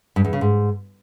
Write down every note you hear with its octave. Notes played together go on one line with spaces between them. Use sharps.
G2
E2
C#3
G#2